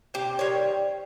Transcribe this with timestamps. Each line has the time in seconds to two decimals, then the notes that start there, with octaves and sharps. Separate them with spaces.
0.14 C3 G4
0.39 D#3 G3 C4 C#5